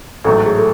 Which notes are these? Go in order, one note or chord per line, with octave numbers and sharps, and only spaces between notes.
A1 G#2 F#3 A3 A4
G#4
A4